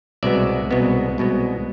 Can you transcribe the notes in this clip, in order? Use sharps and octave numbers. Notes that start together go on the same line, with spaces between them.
C2 B2 G#3 B3 D5 E5
C2 B2 G#3 B3
C2 B2 G#3 B3